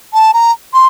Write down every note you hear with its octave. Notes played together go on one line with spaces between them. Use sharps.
A5
A#5
C6